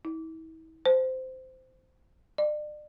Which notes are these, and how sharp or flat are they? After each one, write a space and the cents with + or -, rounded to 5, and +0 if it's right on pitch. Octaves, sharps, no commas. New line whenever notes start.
E4 -40
C5 -15
D5 +40